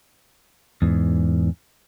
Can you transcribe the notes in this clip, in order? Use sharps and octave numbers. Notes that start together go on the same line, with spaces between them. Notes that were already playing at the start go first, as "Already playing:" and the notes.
E2 G#2